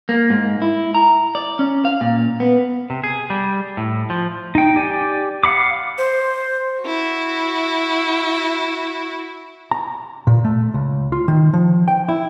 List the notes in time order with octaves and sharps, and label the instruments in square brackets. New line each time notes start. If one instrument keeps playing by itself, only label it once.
[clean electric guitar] A#3
G#2
E4
A#5
D5
C#4
F5
A#2
B3
[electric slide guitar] C3
G#4
G3
A2
F3
[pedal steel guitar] D#4 G5
G4 D5 G#5
F5 F#5 B5 D6
[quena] C5
[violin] E4 F#4
[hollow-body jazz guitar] A#5
A#2
A3
C#2
F4
D#3
F3
G5
E4